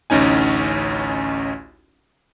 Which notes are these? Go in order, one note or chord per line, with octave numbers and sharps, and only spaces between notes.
A1 D2 C#4 D#4 G#5